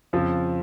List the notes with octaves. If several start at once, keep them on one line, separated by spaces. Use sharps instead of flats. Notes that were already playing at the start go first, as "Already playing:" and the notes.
F2 C#3 F3